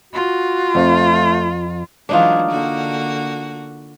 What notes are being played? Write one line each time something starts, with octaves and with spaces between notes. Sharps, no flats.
F4 F#4
F2 A3
E3 F#3 G#3 D4 D#4 F4
D3 A#3 F#4